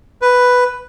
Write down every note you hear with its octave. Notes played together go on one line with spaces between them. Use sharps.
B4